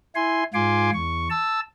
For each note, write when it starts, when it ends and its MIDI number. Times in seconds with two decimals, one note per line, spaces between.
0.15 0.44 64
0.15 0.44 80
0.15 0.44 84
0.54 0.90 44
0.54 0.90 65
0.54 0.90 80
0.54 0.90 84
0.54 0.90 86
0.94 1.28 40
0.94 1.28 85
1.30 1.60 81
1.30 1.60 88